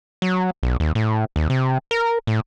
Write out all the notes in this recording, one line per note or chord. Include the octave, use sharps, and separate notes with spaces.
F#3
B1
D#2
A2
D#2
C3
A#4
A2